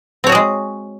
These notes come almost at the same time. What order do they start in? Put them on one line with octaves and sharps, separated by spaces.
C4 C#5 F#4 G#4 G#3